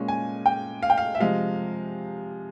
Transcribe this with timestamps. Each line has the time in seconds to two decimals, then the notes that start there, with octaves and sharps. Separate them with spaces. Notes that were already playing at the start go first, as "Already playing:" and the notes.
Already playing: A#2 G#3 C#4
0.08 G#5
0.46 G5
0.83 F5
0.90 G5
0.98 F5
1.15 E5
1.20 C3 F3 G#3 F5